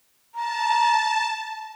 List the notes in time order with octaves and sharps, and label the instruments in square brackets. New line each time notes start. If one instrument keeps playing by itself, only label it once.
[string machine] A5 [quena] A#5